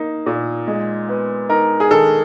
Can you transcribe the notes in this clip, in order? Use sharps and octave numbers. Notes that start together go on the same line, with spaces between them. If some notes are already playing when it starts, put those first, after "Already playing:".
Already playing: A#3 D#4
A#2
G#3
B3
D#4 A#4
G#4
D#3 A4